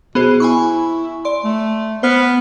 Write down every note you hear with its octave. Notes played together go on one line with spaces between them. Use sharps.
B2 B3 G#4 C5
E4 G#5 B5 C#6
D5 C6
A3
B3 C5 F6